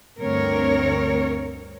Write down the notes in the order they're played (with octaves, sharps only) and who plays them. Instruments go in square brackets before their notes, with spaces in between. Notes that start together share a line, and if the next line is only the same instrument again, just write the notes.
[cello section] D2 G2 C4 A#4 C#5